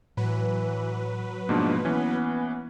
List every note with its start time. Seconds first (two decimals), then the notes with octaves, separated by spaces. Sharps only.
0.17 A2 E3 F#3 B4
1.49 G#2 B2 F3 A#3 D4
1.85 E3 B3 C#4